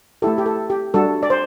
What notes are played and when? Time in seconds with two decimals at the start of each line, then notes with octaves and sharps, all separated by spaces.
0.22 A3 E4 G4 A4
0.38 G4
0.46 A4
0.70 G4
0.94 G3 D4 F#4 A4
1.23 D5
1.30 C5